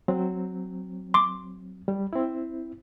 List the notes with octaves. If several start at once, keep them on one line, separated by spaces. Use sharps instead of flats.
F#3 C4
C6 D6
G3
C4 E4